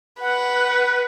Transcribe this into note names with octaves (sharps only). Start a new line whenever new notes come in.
B4 F#5